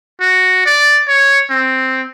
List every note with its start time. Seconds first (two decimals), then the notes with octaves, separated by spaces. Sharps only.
0.21 F#4
0.65 D5
1.08 C#5
1.50 C4